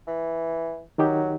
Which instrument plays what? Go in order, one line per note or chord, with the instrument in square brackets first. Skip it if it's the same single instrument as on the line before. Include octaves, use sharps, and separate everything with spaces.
[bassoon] E3
[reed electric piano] D#3 D#4 G4 [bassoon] F#3